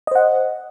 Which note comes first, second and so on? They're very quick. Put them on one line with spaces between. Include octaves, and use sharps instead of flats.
D#5 C5 F#5